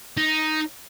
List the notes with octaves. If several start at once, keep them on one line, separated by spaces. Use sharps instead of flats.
D#4